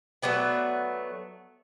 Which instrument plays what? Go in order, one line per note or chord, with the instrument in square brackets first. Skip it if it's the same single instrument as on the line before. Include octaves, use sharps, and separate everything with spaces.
[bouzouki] F#3 A3 B3 D5